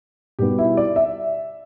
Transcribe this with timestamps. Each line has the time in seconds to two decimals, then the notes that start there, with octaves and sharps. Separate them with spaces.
0.39 B2 G3 B3 G4
0.59 E4
0.77 D5
0.96 E5